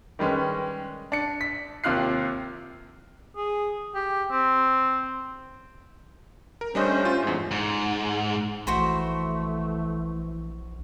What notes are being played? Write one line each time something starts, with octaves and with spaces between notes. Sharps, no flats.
D#3 G3 G#3 C#4 B4
D4 C#7
B6
D#2 C3 F4 F6 F#6 C7
G#4
G4
C4
A#4
G3 A3 C#4 D4 C5 D#5
F4
E2 G#2
G#2
A#1 E3 A3 F#4 C5 B5